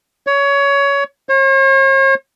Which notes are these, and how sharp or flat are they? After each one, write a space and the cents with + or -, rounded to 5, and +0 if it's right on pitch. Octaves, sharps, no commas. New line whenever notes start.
C#5 +20
C#5 -45